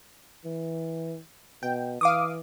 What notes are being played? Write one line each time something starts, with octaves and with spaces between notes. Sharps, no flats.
E3
B2 G5
E3 F5 D6 D#6